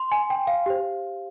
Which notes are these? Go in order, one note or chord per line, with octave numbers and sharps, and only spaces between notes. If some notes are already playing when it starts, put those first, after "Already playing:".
Already playing: C6
G#5
G5
F5
G4 C5